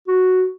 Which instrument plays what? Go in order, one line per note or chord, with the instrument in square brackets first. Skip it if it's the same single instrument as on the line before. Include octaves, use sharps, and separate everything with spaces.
[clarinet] F#4